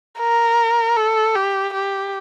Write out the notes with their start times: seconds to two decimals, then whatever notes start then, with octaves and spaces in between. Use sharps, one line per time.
0.19 A#4
0.96 A4
1.35 G4
1.74 G4